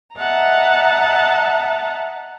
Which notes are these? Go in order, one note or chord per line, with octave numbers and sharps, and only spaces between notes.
D#5 E5 F#5 A5 A#5